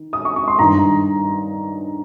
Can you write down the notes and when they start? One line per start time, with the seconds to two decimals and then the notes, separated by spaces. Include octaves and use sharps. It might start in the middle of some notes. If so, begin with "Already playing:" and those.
Already playing: D#3
0.13 D#6
0.25 C#6
0.36 C#6
0.48 C6
0.59 G2 D#3 A#5